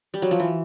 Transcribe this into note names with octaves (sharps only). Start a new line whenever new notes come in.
G3
F#3
F3
E3